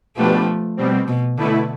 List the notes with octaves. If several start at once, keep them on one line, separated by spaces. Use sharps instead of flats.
B2 F3 A3 B3 D4 G4 B4
B2 G3 C4
B2
B2 D3 A3 E4 B4